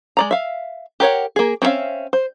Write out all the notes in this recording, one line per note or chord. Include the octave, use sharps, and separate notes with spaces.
G#3 D5 A#5
E5 F5
G4 A#4 C#5 F#5
A#3 G#4
C4 C#4 B4 E5 F5
C5